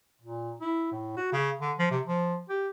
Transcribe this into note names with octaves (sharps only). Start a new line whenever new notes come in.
A#2
E4
A2
F#4
C#3
D3
F3
C3
F3
G4